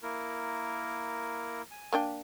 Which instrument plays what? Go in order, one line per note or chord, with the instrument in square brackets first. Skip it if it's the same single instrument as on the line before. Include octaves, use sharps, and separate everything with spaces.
[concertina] A#3 E4 A#4
G#5
[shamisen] A#3 D4 G5